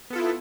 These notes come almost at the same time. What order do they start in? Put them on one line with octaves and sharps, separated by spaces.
B3 A4 F4 E4